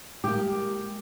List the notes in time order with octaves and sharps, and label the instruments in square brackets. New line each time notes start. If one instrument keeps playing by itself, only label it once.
[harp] G#3 A#3 [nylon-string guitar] G4